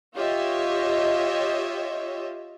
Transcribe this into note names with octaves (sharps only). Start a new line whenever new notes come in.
F4 G4 C#5 D#5 E5